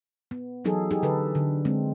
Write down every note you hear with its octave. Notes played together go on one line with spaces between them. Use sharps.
B3
E3 F#3 D#4 G#4 A4
D#4 G4 G#4
D3 A4 B4
D3
G#3 C4